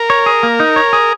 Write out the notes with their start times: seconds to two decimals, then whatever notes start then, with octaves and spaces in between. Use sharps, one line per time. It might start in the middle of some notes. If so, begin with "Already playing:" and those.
Already playing: A#4
0.10 C#5
0.26 G#4
0.43 A#3
0.60 D#4
0.76 C#5
0.93 G#4